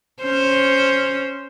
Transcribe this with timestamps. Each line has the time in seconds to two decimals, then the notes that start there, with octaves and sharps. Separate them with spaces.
0.21 C#4 C5